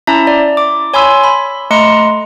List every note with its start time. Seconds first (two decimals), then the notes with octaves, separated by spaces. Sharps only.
0.07 C#4 E4 E5 A5 A#5
0.27 D5
0.57 D6
0.94 C#5 G#5 B5 C6 E6
1.24 B5
1.71 A3 D#5 A#5 C6 C#7